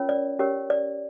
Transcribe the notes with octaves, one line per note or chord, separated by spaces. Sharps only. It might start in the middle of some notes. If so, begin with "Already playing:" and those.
Already playing: C#4 F4 A#4 C#5
D5
C#4 G4 A#4 C#5
D5